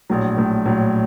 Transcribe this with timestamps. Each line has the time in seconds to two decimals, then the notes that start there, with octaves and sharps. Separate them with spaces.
0.09 A#1 A2 F#3
0.37 A#1 A2 F#3
0.65 A#1 A2 F#3